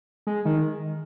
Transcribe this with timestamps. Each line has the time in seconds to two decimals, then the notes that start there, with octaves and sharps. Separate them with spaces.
0.27 G#3
0.45 D#3